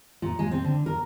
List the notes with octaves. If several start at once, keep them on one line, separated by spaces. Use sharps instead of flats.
A#2
G#3
C4
D3
A#4